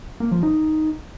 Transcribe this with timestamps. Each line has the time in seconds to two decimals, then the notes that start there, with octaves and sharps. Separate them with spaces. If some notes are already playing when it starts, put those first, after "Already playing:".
0.20 A#3
0.31 F3
0.43 D#4